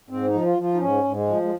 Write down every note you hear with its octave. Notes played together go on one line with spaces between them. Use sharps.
G#2 C4
D#4
F3
F4
F3 F4
D#4
G#2 C#4
G#2
G#3
F3
G#3